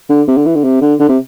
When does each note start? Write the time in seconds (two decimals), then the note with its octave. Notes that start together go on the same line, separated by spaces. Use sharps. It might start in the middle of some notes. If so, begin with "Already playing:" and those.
0.10 D3
0.28 C3
0.37 D3
0.46 E3
0.55 D3
0.64 C3
0.81 D3
0.99 D3
1.09 C3